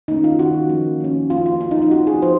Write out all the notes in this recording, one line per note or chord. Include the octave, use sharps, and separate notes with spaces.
D#3 A#3 C#4 D#4
F4
D#3 A#3 C#4 F#4
F3 A#3 C#4
F3 A#3 C#4
F3 A#3 C#4 F4
F4
F3 A#3 C#4 F4
D#4
F4
F3 C4 F#4
G#4
F3 C5